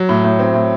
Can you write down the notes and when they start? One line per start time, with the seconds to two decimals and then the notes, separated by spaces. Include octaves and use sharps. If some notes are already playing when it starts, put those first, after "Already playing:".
Already playing: F#3
0.09 A2
0.24 A2
0.39 C4
0.54 A2